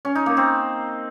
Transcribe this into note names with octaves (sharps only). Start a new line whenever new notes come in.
C#4
D#4
A#3
C4